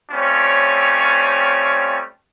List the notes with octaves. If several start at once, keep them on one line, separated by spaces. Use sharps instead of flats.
G3 A3 C4 C#4 F4 C#5